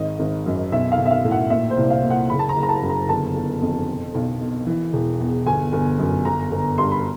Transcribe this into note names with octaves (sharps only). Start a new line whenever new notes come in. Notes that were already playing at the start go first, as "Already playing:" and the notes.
Already playing: G#1 D#5
G#1
F#2
B1 E5
F5
B1
E5
F5
A2
F#5
A#2 E5
C5
C2
F5
A#2
F#5
F#1 B5
A5
A#5
F#1
A#5
A5
F#2
A#5
G1 A5
G1
F2
B2
B1
B2
E3
E1
E2
G1 G#5
G1
F#2
G1 A#5
G1
G2 C6
B5